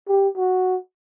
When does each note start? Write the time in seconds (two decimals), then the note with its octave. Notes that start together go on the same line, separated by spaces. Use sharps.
0.08 G4
0.37 F#4